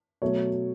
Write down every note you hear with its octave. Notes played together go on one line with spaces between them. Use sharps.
B2 F#3 A3 C#5